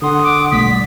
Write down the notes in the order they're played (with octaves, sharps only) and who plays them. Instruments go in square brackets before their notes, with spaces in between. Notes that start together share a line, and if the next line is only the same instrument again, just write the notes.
[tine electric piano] D3 C6 [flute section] F#5 D#6
[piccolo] D6
[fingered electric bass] B1 G3 A3 [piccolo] B6
[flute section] D5